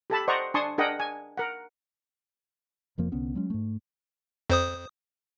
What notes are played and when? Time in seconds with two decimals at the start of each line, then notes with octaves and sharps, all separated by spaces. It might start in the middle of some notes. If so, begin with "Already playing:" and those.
0.10 G4 A4 A5 B5
0.28 C5 D5 D#5 F#5 A#5 C#6
0.54 D4 G#5 A5 C6 C#6 D#6
0.78 D4 G#4 A#4 D#5 F#5 G5
1.00 G#5
1.37 A#4 F#5
2.98 F1 F2 F3 A#3
3.12 C2 D3 B3 C#4
3.35 F#3 G#3 C#4
3.50 G#2 A3
4.50 F2 C5 D#6